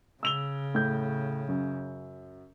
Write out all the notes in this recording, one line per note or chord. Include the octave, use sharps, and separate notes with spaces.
C#3 E6 F7 G7
A2 G6
F#2